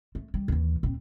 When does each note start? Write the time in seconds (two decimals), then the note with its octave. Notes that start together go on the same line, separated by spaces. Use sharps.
0.15 A3
0.34 G3
0.48 D#2 E3
0.83 D#1 C4